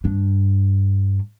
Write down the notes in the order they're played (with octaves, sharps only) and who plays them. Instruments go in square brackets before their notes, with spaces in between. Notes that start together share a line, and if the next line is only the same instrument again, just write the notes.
[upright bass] G2 D4